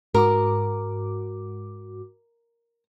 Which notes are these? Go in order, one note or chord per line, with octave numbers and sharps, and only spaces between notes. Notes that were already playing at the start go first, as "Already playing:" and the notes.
G#2 F#4 A#4 D6